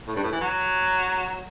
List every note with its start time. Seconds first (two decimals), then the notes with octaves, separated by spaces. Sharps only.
0.07 A2
0.16 G2
0.23 A2
0.32 E3
0.41 F#3